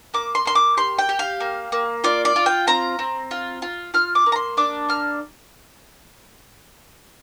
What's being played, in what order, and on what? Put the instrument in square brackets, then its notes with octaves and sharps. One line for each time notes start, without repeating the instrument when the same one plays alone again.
[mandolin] A#3 D6
C6
A#3 C6
D6
G4 C6
G5
G4
F5
A#3
A#3
F4 D5
D5
F4
G5
C4 A#5
C4
F4
F4
F4 F6
D6
A#3
A#5
C6
D4 D6
A#3 F6